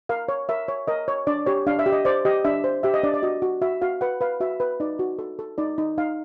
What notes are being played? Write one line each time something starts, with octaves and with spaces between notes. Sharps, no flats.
A#4 F5
C#5
A#4 E5
C#5
A#4 D#5
C#5
D4 D5
G4 C#5
D4 F5
E5
G4
D#5
C5 D5
G4 D#5
D4 E5
C5
G4 E5
D#5
D4 D5
D5
F#4 D#5
F#4
F#4 E5
F#4 F5
B4 F#5
B4 F5
F#4 E5
B4
D#4 D5
F#4
A4
A4
D#4 D5
D#4
D#4 F5